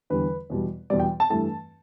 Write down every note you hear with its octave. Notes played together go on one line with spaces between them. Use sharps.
E2 D3 G3 B4
E2 B2 G3
E2 B2 G3 D5
G5
A5
G2 E3 A3 A5